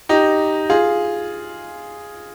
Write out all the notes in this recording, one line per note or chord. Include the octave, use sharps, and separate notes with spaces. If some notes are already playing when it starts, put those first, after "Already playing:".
D#4 G4
F4 G#4